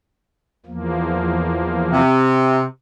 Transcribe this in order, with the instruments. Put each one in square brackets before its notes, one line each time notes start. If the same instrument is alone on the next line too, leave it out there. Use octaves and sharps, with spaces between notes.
[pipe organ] E2 F3 A#3
[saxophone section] C3